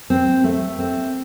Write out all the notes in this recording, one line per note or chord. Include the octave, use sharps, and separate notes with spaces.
C4
A3
C4